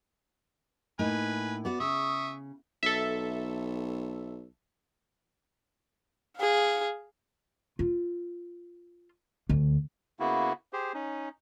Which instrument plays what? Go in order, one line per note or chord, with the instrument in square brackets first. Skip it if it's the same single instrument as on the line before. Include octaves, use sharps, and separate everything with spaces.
[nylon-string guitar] A2 A#3 D#4 [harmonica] B4 G#5
[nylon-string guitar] B3 F#4 [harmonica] D5
[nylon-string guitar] C#3 [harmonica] E5 C#6 D#6
[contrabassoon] B1 [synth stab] A4 E5
[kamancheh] G#4 F5
[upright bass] F4
D2
[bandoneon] C#3 A#3 B3 E4 F#4
G4 G#4 C5
C#4 D#4